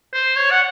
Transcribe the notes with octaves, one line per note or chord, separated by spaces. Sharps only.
C5
C#5
F#5